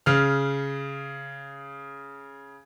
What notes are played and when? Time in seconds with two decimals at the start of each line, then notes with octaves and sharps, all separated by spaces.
0.06 C#3 F6